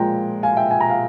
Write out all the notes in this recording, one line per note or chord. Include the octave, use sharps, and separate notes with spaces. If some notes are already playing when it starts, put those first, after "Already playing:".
Already playing: A#2 F3 G#3 G5 A#5
F5 G#5
E5 G5
G#5
A#5
F5 G#5